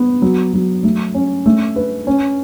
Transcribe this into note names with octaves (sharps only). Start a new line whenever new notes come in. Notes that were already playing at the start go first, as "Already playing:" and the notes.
Already playing: B3
F#3
F#3
A3
C#4
A3
B4
C#4